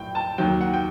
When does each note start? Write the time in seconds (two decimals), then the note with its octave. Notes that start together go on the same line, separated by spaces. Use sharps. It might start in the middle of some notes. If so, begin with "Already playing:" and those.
Already playing: A#1 A2 F#3 G5
0.15 A5
0.38 D#2 D#3 F#3 G5
0.61 F#5
0.74 G5